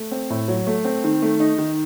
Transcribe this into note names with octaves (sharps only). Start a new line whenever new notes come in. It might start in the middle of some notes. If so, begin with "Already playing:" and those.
Already playing: A3
C4
A2
F#3
A3
C4
D#3
A3
D#4
D#3